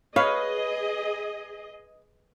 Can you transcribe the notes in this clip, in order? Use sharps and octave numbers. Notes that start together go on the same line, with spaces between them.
G#4 B4 C#5 D#5 F5